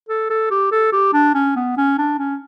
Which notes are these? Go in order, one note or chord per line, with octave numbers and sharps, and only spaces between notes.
A4
A4
G4
A4
G4
D4
C#4
B3
C#4
D4
C#4